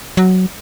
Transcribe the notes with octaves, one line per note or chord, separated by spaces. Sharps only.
F#3